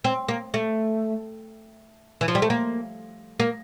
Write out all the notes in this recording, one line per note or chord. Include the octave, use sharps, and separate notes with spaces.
C4
A#3
A3
E3
F3
G3
A3
A#3
A#3